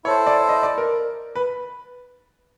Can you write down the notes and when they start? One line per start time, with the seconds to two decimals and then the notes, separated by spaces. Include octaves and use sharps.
0.05 E4 A4 C5 C#5
0.27 D5
0.49 D#5
0.63 D5
0.78 A#4
1.35 B4